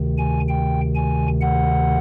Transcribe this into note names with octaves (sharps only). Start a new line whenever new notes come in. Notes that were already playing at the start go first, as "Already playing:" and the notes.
Already playing: D2 C3 D#3
G#5
G5
G#5
F#5